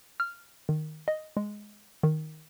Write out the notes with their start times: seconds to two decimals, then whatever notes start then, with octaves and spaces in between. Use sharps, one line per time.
0.20 F6
0.69 D#3
1.08 D#5
1.37 G#3
2.03 D#3